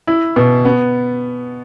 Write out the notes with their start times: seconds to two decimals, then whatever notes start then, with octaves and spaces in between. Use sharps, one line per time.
0.07 E4
0.36 B2
0.65 B3